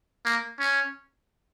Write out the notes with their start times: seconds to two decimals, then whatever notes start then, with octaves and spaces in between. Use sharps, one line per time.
0.26 A#3
0.60 C#4